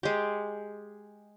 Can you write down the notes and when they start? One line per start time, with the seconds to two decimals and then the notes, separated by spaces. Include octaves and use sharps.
0.03 G#3 G4